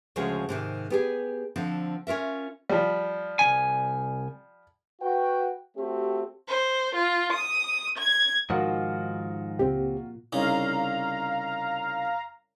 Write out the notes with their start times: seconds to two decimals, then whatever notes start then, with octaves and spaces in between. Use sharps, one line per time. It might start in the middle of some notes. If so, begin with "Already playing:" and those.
0.16 D2 C#3 F3 G#3 F#4 G#4
0.49 G#2 C3 D#3
0.90 B3 G4 G#4
1.56 D3 F3 C4
2.07 C#4 F4 A#4 E5
2.70 F3 G3
3.39 C2 C#3 G#5
5.02 F#4 B4 G5
5.77 A3 C4 F#4 G4
6.47 C5
6.96 F4
7.32 D#6
7.97 G#6
8.50 G#2 D#3 F3 F4 F#4 A#4
9.59 C#2 A#2 C4 G4
10.33 C2 C#3 D#4 F5 A#5